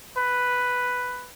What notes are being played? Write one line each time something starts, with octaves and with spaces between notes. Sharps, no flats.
B4